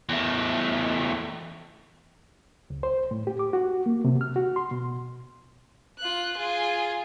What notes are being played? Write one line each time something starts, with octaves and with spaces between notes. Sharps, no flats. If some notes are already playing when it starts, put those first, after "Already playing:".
E2 A3
C#2
C5
A2
G4
D6
F#4
A#3
C3
F6
F#4
C6
B2
F4 F#6
F4 G#4